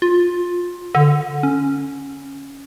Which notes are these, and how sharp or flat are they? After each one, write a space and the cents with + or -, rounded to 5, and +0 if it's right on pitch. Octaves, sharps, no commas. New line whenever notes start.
F4 +15
D3 +0
C#4 -5